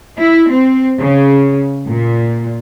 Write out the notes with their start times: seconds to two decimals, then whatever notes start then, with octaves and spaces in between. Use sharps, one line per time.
0.19 E4
0.52 C4
1.00 C#3
1.89 A#2